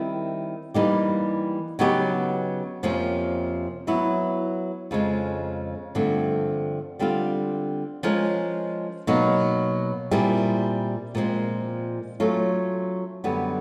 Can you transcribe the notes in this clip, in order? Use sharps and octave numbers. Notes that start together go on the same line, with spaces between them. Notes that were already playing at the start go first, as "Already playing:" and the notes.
Already playing: D#3 G3 C4 E4
E3 G3 A#3 D#4 G4
C#3 F#3 B3 D#4 G4
F2 C3 F3 A#3 C#4
F#3 B3 E4
F2 C#3 F3 G#3
G2 D3 F3 A3 C4
D3 G3 C4 F4
F3 G#3 C#4 F4 A#4
B2 F#3 A#3 D#4
A#2 G3 C4 E4 G#4
A#2 F3 G#3 C4
F#3 A3 C#4 F4 A4
F#2 D3 G3 B3